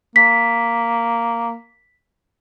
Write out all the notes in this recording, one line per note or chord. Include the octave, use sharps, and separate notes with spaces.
A#3 B6